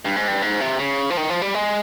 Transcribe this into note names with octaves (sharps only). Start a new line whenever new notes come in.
G2
G#2
G2
G#2
C3
C#3
F3
D#3
F3
G3
G#3